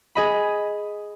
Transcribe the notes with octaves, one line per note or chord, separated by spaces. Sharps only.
G#4 D#5 B5